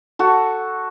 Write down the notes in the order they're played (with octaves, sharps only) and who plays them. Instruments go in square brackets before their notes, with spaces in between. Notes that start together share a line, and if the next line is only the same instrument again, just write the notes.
[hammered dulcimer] F#4 A4